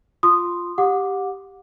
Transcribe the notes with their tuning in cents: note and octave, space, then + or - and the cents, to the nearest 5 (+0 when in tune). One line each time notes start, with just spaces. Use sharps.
F4 +0 C6 +0 D#6 -15
G4 +0 F#5 -30 D6 +0